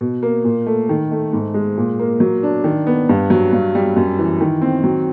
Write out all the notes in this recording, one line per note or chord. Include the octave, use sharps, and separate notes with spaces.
B2
A#3
A#2
A3
D#3
A3
G#2
G#3
A#2
A#3
F#3
D4
D#3
B3
G2
F#3
G2
G3
F#2
E3
D#3
C4
F#3